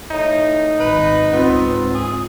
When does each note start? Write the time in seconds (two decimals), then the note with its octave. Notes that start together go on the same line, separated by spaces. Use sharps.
0.11 A2 D#4
0.80 G#1 B4
1.32 C#2 G#2 B3 C4 F4
1.94 G#4